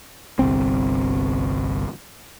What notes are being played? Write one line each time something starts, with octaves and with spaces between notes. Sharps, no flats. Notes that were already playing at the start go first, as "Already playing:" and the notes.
G1 C2 C4